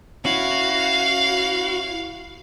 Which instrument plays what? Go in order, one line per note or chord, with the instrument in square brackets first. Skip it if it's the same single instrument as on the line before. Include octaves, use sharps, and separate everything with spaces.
[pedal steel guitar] C#4 E4 [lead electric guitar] F#4 [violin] F5